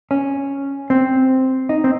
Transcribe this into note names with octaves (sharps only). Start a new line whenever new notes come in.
C#4
C4
D#4
C4